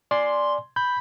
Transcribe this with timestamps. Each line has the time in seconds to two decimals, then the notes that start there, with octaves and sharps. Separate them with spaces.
0.11 D5 G#5 C6
0.76 B5 G6